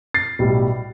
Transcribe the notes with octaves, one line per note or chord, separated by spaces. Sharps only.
A6 C7
B1 A2 G3